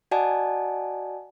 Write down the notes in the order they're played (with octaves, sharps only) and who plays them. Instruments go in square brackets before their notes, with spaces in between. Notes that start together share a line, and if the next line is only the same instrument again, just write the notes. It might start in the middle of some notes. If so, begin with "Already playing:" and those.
[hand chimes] F#4 D5 D#5 F#5 G#5 A5